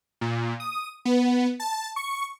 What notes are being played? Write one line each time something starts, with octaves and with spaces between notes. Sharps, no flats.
A#2
D#6
B3
A5
C#6